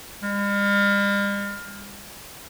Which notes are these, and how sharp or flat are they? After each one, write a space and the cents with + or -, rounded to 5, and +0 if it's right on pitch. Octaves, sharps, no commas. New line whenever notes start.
G3 +45